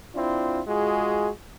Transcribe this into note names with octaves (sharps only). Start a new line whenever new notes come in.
C4 D4 E4 F4
G#3 F4 F#4 G#4